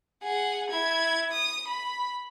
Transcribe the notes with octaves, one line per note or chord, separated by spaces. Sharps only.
G#4 F#5
E4 G#6
D#6
B5